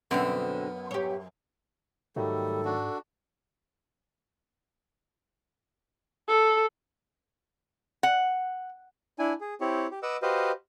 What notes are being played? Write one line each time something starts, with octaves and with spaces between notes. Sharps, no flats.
F#2 B2 D3 B3 C4
G4 C#5
G#2 D#3 F#3 G3 A3 A4
D4 F#4
A4
F#5
D4 E4 G#5
G#4
C4 E4 G4 C#5
G4
B4 D#5 F#5 D6 E6
F#4 G4 B4 C5 D#5 F5